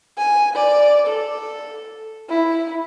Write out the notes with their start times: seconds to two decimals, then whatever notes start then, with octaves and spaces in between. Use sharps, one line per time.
0.17 G#5
0.56 D5
1.06 A4
2.29 E4